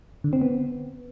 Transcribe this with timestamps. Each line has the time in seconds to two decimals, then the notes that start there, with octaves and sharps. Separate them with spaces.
0.24 D3
0.33 C4
0.41 B3